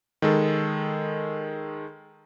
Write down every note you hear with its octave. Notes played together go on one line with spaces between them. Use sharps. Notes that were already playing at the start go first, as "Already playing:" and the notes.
D#3 G#3 A4